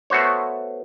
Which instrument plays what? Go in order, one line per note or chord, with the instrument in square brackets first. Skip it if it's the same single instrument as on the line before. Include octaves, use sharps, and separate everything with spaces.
[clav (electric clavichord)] A3 B3 F#4 C5 C#5